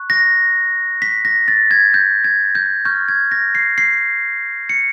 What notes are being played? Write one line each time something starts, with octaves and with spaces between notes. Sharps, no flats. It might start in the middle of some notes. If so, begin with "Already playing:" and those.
Already playing: C#6 F#6
A#6
B6
A#6
A6
G#6
G6
G#6
G6
C#6 F6 G6
G#6
A#6
C7
C7
C#7